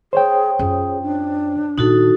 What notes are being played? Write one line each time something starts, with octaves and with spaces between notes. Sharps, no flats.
G#4 C5 C#5 G5
F#2 F4 G#4
D4
A#2 D#3 D#4 F#4 A4